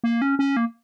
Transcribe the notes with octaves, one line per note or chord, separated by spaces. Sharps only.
A#3
C#4
C#4
A#3